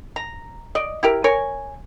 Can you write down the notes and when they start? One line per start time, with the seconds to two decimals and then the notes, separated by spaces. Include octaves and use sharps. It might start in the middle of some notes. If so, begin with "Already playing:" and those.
0.16 A#5
0.75 D5 D#5
1.03 E4 G4 A#4
1.24 A#4 C#5 G#5